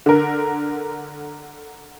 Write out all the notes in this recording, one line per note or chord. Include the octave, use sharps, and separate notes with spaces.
D3 A#4